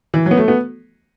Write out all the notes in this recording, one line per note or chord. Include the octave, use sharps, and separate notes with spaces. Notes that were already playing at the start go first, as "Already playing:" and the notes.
E3
F#3
B3
A3
B3